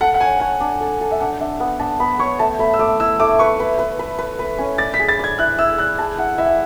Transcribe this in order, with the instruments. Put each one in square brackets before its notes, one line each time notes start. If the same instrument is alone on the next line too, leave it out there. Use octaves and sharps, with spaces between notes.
[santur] A4 [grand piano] F#5
[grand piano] F#5
[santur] C#5 [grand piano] G#5
[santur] C#5 [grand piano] F#5
[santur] D4
A4
A4
[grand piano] E5
[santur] D4 [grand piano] F#5
[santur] D4 [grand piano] E5
[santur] B3 [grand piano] F#5
[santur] D4 [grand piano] A5
[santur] B3 [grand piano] B5
[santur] C#5 [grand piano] C#6
[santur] A3 [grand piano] A5
[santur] A3 [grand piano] B5
[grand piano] E6
[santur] A3 [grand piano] D6
[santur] E4 [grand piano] E6
[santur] A3 [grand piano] D6
[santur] B4 [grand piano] C#6
[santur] B4
B4
B4
B4
B4
C#4
[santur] D5 [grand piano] A6
[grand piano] B6
[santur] G#4
[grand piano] A6
[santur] D5 [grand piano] G#6
[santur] E4 [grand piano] F#6
[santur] E4 [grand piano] E6
[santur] D5 [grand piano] F#6
[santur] G#4 [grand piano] A5
[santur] E4 [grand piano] F#5
[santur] E4 [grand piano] E5